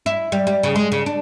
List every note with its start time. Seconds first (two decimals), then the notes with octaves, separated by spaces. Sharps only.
0.06 E4
0.32 G3
0.47 G3
0.63 C#3
0.76 G#3
0.92 C#3
1.06 D4